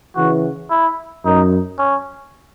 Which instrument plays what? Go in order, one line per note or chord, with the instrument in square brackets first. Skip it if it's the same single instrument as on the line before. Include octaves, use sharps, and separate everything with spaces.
[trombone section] C#3 E3 [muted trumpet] F#4
[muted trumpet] E4
[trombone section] F#2 [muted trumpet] D#4
[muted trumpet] C#4